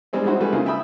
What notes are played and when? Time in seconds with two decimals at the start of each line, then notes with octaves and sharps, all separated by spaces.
0.13 G3 G#3 C4 D4
0.24 G3 D#4 E4 F#4 C5
0.41 G3 A3 G#4 B4
0.53 C#3 A#3 E4 F4 C5
0.66 E5 G5 B5 D#6 E6